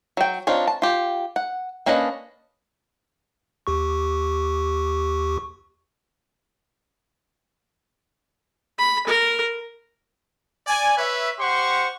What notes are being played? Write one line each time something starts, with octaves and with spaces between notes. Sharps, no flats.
F#3 G5
C4 D4 D#4 F4 C#5
A5
F4 G4
F#5
A#3 C#4 D4 B4 D#5
D#2 G4 C#6
B5
A#4
D5 G#5
B4 C#5 E5
G4 C5 F#5 C6 C#6